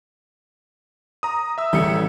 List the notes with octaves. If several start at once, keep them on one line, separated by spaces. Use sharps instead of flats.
A#5 D#6
E5 E6
A1 A2 C#3 E3 G3 C#7